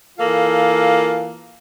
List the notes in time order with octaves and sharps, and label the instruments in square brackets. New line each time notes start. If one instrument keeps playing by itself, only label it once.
[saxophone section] E3 A#3 F4 A4 F5